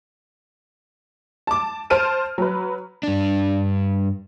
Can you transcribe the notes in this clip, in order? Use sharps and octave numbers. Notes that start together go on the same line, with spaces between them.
A5 D6
C5 A5 F6 D7 D#7
F#3 B4
G2 D4